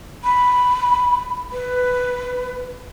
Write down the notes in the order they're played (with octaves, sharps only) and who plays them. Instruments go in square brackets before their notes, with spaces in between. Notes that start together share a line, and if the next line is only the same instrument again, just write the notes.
[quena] B5
B4